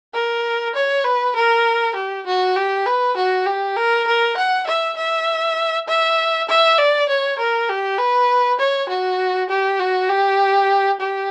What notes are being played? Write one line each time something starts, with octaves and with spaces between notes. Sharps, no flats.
A#4
C#5
B4
A#4
G4
F#4
G4
B4
F#4
G4
A#4
A#4
F#5
E5
E5
E5
E5
D5
C#5
A#4
G4
B4
C#5
F#4
G4
F#4
G4
G4